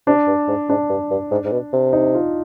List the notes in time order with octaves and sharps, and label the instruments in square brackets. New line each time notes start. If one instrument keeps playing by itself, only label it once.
[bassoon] C3 [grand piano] D4
[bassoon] G2
G#2
[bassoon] G#2 [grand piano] D4
[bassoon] G2
G2
G#2
G#2
B2
C3
[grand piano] D#4
F4